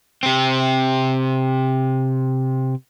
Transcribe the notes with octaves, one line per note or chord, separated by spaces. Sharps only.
C3 C4